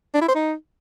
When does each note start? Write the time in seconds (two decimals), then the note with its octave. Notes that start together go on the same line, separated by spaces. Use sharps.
0.15 D4
0.21 E4
0.28 C5
0.35 D#4